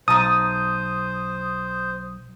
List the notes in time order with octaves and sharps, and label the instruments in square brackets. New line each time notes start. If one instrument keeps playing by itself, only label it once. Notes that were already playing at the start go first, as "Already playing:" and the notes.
[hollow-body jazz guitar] B1 [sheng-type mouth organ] C5 [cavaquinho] A5 A#5 [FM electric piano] D#6